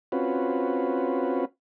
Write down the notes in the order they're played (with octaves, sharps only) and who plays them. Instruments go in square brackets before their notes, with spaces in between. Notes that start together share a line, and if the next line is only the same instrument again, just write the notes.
[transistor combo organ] C4 C#4 F4 F#4 B4